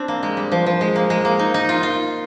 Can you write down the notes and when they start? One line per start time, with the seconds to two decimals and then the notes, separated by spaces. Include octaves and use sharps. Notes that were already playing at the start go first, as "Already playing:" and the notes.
Already playing: C4 D4
0.08 A#3
0.23 G#3
0.37 G3
0.52 F3
0.66 F3
0.81 G#3
0.96 A#3
1.10 G#3
1.25 A#3
1.39 D#4
1.54 D#4
1.69 F4
1.83 F4